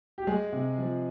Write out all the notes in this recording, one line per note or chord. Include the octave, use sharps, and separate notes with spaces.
G4
G#3 G#4
C3
F3